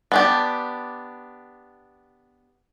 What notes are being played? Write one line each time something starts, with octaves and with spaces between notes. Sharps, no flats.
B3 D4 G4